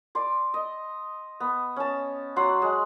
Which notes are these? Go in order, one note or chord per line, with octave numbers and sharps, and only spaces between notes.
D5 C6
D#5
B3
C#4 A5
F#3 F#5 C6
G#3